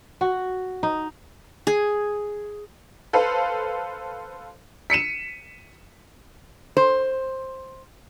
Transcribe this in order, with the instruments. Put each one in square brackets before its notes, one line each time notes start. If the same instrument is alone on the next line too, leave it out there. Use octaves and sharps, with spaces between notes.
[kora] F#4
D#4
[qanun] G#4
[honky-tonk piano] A4 B4 C5 F5
[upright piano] B6 C#7 D#7 E7
[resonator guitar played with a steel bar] C5